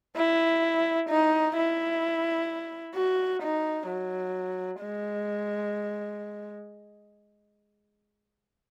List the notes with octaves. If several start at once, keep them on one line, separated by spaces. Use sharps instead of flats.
E4
D#4
E4
F#4
D#4
F#3
G#3